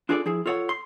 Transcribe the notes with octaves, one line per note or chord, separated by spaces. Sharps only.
D4 F4 G#4 A4 C5 D5
F3 E4 G#4
F4 A4 C#5 D5 F#5
C6